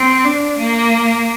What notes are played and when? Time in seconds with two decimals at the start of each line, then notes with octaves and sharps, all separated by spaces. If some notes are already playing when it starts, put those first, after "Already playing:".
Already playing: C4
0.25 D4
0.59 A#3